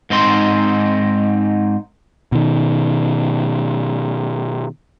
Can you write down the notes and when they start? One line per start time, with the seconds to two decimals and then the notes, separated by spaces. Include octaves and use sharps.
0.10 G#2 C4 D#4 C6
2.32 B2 D#3